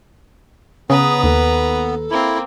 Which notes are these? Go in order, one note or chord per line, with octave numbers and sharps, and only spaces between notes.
C#3 B3 B4 A#5 D#6
D#2 A4
A#3 C4 E4